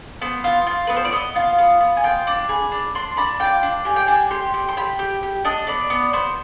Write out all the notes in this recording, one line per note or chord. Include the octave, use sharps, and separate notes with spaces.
B3 C5
F4
F4
B3 B4
C5
D5
B3 D#5
F4 F5
B3
B3
G#5
F4 G5
D4
G#4 B5
D4
D4 C6
D4 B5
F4 G5
D4
G4 G#5
G5
D4 G#5
G4 C6
G4
C6
G4 B5
G4
G4
D4 D#5
B3 D5
B3
B3 C5